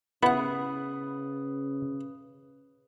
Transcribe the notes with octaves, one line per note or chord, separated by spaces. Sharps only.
C#3 B3 E4 B4 F#5 D#6